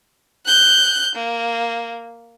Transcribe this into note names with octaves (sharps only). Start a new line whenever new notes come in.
F#6 G6
A#3